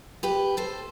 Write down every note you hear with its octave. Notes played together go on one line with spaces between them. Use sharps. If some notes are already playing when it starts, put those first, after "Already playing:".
G4 B4
A4 C5